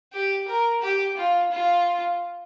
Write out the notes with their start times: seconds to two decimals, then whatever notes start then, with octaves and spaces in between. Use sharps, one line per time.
0.13 G4
0.48 A#4
0.82 G4
1.17 F4
1.52 F4